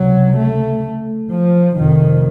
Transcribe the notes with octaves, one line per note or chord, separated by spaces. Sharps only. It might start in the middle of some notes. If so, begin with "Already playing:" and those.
Already playing: C#2 C3 F#3
A3
F3
F1 F2 C3 D#3